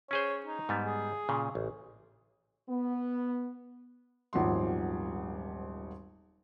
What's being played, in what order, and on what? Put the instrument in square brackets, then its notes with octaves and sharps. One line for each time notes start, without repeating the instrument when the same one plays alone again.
[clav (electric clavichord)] C#4 G#4 C5 [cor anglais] C#5
[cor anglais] D#4
[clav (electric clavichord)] G#2 G3 B3
[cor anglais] G#4
[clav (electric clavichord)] A#2 C#3
A1
[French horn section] B3
[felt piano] D#1 G#1 F3 F#3 C6